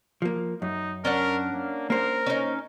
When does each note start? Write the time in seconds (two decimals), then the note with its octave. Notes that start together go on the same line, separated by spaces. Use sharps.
0.22 F3 A#3
0.62 F#2 D#4
1.05 C#4 D4 A#4 F#5
1.54 A#3
1.90 A#3 A#4 C5
2.27 C#4 D#4